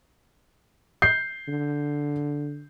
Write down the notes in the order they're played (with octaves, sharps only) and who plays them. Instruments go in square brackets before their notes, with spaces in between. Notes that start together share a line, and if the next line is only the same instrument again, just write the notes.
[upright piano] G6 C7
[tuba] D3